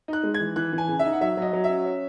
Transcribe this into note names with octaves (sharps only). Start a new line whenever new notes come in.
D#4 F#6
G#3
G#6
E3
E3 F#6
E3
G#5
C#3
E5
D#4
F#5
F#3 E5
F#3 D#5
F#3
C#4 E5
C#4